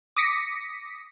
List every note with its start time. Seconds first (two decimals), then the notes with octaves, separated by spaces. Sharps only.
0.16 D6 D#6 A#6 B6 C#7